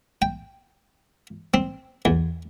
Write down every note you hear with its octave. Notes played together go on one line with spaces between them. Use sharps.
G5
C4
E2